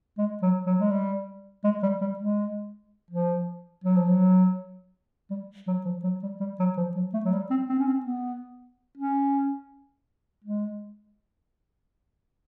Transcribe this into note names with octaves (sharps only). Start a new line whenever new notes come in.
G#3
F#3
F#3
G#3
G3
G#3
G3
G3
G#3
F3
F#3
F3
F#3
G3
F#3
F3
F#3
G3
G3
F#3
F3
F#3
A3
F#3
G3
C4
C4
C#4
C4
B3
C#4
G#3